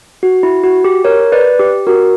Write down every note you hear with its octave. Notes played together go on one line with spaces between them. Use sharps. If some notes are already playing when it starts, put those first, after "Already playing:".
F#4
E4
F#4
G4
A#4 C#5
B4 D5
G4
F#4 A#4